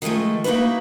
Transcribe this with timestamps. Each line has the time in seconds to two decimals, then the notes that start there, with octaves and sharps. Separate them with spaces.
0.02 D#3 F3 F#3 G#3 A3
0.44 A#3 D#4 E4 F#4 B4